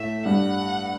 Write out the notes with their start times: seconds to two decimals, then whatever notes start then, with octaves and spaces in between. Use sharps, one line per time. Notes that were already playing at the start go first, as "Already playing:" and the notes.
Already playing: A2 A3 E5
0.25 G2 G3 F#5